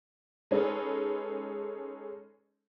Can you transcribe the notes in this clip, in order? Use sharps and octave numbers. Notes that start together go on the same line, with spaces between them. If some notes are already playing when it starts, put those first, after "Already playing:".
G#3 C#4 D#4 A4 B4